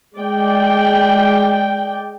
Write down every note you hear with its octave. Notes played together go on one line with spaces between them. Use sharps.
G#3 D5 G5